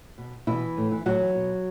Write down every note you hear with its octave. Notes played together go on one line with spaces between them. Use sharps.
B2
B2 E3 E4
A2
E3
A2 F#3 F#4
E3
B2